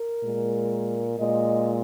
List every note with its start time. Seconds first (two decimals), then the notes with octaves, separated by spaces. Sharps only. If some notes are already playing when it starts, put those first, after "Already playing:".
Already playing: A#4
0.24 A#2 G#3
1.18 A#2 G#3 D#5